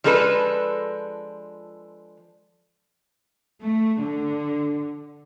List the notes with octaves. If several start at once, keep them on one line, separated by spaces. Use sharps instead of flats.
F3 G#3 D4 A4 B4
A3
D3